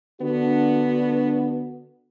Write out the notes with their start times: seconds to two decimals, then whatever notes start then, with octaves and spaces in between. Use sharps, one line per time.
0.21 D3 B3 D4 F#4